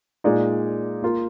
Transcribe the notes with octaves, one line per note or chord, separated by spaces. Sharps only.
A#2 G#3 D#4 G#4 D5
A#3 F4 A#4